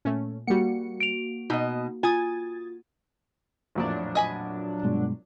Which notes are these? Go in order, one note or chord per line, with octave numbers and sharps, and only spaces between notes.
A#2 A3 C#4
G3 A#3 F#4 F#5 C#7
D7 F7
B2 D#4 D#5
F4 G#5 D#6 G#6 A6
A1 F2 A#2 F#3 D4
D#5 G#5 B5
G2 B2 G#3